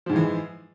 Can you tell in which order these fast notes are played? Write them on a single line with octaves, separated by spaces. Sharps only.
F3 G#2 G#3 E3